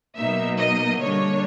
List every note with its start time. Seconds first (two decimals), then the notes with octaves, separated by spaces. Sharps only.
0.17 B2 F#3 A#3 D#4 E5
0.59 D#5
1.01 D3 G3 A#3 D4 C#5